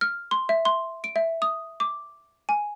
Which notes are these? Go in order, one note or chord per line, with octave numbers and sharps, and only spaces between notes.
F6
C6
E5
C6
D7
E5
D#6
D6
G#5